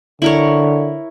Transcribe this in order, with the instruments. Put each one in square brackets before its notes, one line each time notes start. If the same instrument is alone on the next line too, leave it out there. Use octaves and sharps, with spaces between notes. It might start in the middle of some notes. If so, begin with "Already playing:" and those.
[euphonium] D3 [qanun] E4 A#4 C#5